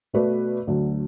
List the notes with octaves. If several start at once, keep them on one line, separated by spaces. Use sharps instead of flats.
B2 A3 F#4 B4 D5
D2 D3 F#3